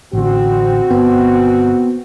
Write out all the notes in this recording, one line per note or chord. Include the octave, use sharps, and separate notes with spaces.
A1 D3 C4 F#4
G1 B3